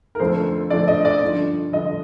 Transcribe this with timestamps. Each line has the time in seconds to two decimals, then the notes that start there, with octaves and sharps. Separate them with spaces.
0.15 A#4
0.19 F2 D3 F3 A3 C5
0.70 F2 D3 F3 A3 D5
0.88 D#5
1.05 D5
1.22 G2 D3 F3
1.72 G2 D3 F3 D#5